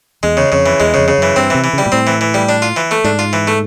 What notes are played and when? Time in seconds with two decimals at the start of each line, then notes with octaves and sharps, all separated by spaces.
0.23 E2 G#3
0.37 C#3
0.52 F2 C#3
0.66 E3
0.80 E2 G#3
0.94 F2 C#3
1.08 C#3
1.18 F#2 E3
1.36 G2 C4
1.50 C3 E3
1.64 E3
1.73 C#3 G3
1.86 A#2
1.92 A2 C4
2.07 E3
2.21 E3
2.34 G3
2.49 D4
2.62 F4
2.76 E3
2.91 A3
3.04 G#2 D4
3.19 F4
3.33 E3
3.47 A3